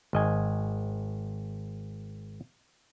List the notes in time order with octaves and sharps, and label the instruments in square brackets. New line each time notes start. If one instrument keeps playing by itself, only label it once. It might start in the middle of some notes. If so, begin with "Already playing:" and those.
[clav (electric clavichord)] G#1 D#5 G#5